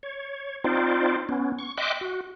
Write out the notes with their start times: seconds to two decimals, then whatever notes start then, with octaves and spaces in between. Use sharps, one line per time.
0.03 C#5
0.64 C4 D#4 F4 C5 D5
1.29 B3 C#4
1.59 C#6
1.78 D#5 E5 G5 C6 D6 F#6
2.01 F#4